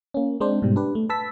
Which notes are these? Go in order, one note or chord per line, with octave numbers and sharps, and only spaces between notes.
A#3 C#4
G#3 C4 D4 C5
G#2 B2 G3
D4 G4 B4
A3
B4 A5 E6 B6